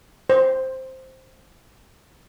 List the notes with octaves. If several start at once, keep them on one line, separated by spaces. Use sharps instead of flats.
C5